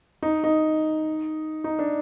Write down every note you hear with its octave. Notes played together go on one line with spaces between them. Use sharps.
D#4
D#4
D#4
D4